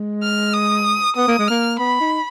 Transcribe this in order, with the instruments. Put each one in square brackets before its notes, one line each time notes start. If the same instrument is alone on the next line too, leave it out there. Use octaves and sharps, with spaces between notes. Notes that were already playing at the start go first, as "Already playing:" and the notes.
Already playing: [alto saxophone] G#3
[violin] F6
D#6
[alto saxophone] B3 [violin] D#6
[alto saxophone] A#3
G#3
[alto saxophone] A#3 [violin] F6
[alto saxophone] B3 [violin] B5
[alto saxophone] D#4